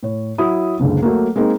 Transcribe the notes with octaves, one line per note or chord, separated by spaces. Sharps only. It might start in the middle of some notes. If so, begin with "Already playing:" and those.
A2 C#5
F#3 E4 D#6
F#1 C#2 D3
F#3 A3 A#3
G#3 A#3 C4 D#4